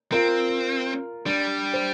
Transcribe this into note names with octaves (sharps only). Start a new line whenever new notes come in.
C4 F4 A#4
G3 D4
C5